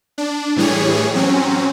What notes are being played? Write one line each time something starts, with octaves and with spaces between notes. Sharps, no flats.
D4
A2 E3 G3 G#4 C#5
F#3 C4 C#4